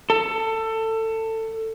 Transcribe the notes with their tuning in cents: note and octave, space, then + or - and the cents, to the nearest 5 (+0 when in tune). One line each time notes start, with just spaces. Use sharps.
A4 +20